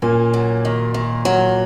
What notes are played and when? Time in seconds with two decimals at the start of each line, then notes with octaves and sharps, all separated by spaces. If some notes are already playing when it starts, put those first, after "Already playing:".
0.02 A#2 A#3 C#4
0.34 F#3
0.65 D#3
0.94 D#3
1.25 F#3